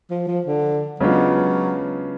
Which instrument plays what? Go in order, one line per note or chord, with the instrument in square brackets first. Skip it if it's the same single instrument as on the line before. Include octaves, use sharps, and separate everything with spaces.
[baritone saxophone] F3
F3
D3
[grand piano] C#3 G#3 B3 D4 F4 [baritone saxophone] F#3